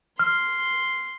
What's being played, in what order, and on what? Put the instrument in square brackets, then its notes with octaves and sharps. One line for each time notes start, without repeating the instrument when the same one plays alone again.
[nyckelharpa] C6 [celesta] F6